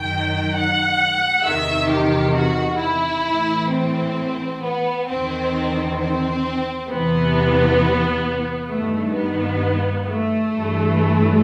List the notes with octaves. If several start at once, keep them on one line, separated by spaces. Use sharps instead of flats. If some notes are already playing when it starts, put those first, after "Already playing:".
Already playing: F#2 D#3 G5
F#5
E2 C3 D#3 E5
G4
F#4
E4
A2 E3
C4
B3
E2 D#3 C4
C4
E2 C3 E3 B3
G2 D#3 A3
B3
A3
G2 E3